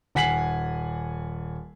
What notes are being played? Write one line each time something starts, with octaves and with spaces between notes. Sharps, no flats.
D#1 F#5 G#5 B6 C7 F#7